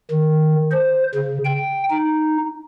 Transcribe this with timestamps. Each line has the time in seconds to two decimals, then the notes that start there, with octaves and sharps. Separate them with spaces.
0.11 D#3
0.71 C5
1.15 C#3
1.45 G5
1.90 D#4